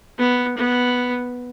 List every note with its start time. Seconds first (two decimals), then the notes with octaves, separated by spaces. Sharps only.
0.19 B3
0.57 B3